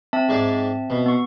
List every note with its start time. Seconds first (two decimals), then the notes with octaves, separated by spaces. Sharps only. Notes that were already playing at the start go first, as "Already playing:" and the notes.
0.13 C4 E5 A5
0.29 G#2 G#3 D5
0.90 B2
1.06 B3 C#6